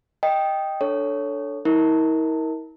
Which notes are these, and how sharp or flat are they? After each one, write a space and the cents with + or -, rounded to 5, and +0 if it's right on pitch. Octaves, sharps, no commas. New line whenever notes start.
D#5 +0 G5 +0
D4 +0 A4 +0 C#5 +10
E4 -45 A#4 +0